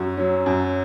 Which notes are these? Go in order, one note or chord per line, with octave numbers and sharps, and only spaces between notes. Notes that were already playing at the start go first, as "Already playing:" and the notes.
Already playing: F#2 F#4
F#3 C#4
F#2